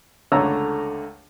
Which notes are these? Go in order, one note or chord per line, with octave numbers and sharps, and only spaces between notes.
C#2 D3 A3 C#5 A#5 E6